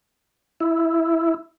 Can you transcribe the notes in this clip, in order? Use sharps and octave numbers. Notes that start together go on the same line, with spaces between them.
E4